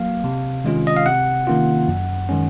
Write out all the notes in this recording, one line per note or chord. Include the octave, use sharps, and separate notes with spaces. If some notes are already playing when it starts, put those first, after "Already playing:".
Already playing: F#3 A#3 F5
C3
D#3 G#3 C#4 F4
D#5
F5
C3 F#5
D#3 A#3 C#4 F4
F#2
D#3 G#3 C#4